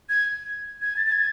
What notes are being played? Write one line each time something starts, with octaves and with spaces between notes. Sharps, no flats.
G#6
G#6
A6
A6
G#6